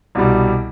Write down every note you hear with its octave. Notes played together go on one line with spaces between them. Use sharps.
C2 B2 G3